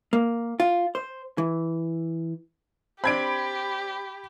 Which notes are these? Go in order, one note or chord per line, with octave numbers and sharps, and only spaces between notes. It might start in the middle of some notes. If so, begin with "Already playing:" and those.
A#3
F4
C5
E3
C4 D4 G4 B5 G#6 D7